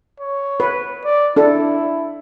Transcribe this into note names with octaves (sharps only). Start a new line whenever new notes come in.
C#5
B4
D5
D4 E4 A4